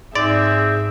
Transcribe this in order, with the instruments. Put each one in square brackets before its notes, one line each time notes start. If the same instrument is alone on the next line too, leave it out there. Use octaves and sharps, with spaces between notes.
[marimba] G#2 D#4 [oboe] C4 [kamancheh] G#4 E5 [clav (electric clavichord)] D5